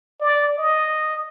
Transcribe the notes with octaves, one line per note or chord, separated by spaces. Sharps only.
D5
D#5